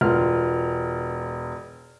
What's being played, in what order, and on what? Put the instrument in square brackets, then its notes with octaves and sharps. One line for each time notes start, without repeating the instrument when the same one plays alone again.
[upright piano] E1 B3 F4 F6